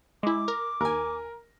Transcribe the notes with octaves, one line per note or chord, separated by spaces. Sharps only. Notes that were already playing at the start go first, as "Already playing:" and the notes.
G#3 E4 D6
A#4
D#2 A#4 G#5